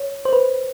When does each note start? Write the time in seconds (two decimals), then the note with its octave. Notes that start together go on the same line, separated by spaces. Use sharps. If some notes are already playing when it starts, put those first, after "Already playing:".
Already playing: C#5
0.25 C5
0.33 B4